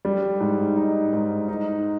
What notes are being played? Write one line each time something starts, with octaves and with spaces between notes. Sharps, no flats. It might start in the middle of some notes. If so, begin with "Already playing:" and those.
G3
G#2
D#4
G#2
D#4